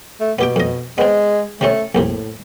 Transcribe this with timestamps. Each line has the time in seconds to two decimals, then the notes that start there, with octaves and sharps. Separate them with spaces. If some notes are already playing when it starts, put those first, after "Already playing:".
0.21 A3
0.39 B2 B3 G4 G5
0.56 F2 D#5
0.98 G#3 B3 C4
1.61 C3 A3 C4 C#4
1.95 A#1 F2 A2 C3